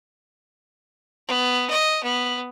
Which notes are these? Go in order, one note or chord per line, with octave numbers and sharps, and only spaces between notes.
B3
D#5
B3